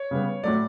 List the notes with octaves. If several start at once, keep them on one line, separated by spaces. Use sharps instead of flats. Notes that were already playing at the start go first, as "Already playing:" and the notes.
Already playing: C#5
C#3 G3 B3
A2 F#3 A3 D5